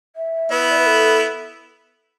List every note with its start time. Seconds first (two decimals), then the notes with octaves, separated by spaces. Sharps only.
0.16 E5
0.51 B3 E4 B4
0.71 D5
0.79 B4
0.87 A4